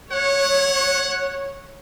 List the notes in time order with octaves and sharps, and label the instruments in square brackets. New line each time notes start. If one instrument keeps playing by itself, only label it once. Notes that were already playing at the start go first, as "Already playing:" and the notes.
[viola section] C#5 [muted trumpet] F#5